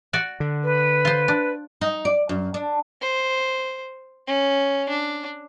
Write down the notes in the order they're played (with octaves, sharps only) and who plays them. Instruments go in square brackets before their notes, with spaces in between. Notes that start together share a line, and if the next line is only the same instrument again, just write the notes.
[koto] F#4 D5
[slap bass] D3
[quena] B4
[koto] F4 C5
D4
[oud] D#4
D5
F#2
D4
[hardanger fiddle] C5
C#4
D4